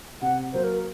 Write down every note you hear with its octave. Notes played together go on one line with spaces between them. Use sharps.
C3 F#5
F#3 A#3 C5
A#4